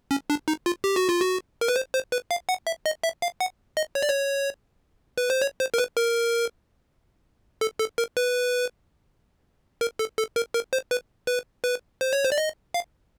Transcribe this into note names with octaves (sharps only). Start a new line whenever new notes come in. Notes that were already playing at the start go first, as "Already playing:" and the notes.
C#4
D4
D#4
F4
G4
F#4
F4
F#4
A#4
B4
C5
C5
B4
F5
F#5
E5
D#5
E5
F5
F#5
D#5
C#5
D5
C#5
B4
C5
C#5
C5
A#4
B4
A#4
A4
A4
A#4
B4
A#4
A4
A4
A#4
A#4
C5
B4
B4
B4
C5
C#5
C5
D5
D#5
F5